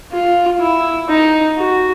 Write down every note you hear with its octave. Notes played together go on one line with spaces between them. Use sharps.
F4
E4
D#4
F#4